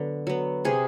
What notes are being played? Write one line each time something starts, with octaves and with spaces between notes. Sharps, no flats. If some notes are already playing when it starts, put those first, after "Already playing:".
Already playing: D3 F#3 B3
F#3 B3
C3 G#4